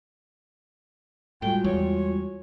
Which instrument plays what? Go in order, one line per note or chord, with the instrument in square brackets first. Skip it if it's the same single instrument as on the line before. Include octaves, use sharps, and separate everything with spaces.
[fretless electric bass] A2 [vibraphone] G3 G#3 F#4 [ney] F4 [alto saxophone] G5
[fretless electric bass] E2 [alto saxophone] C#5